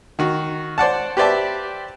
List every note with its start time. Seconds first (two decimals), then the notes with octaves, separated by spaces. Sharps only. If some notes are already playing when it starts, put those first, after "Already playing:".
0.19 D#3 F#4
0.78 C5 D5 F#5 A5
1.17 G4 B4 C5 D5 E5 A5